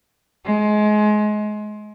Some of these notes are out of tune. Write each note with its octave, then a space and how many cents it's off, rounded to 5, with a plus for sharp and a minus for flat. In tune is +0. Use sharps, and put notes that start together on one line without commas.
G#3 +25